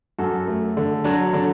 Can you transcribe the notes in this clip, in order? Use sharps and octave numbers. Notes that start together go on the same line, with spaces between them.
F#2 F#4 A4
A3
D3
F#3 D4 F#4
D3 D4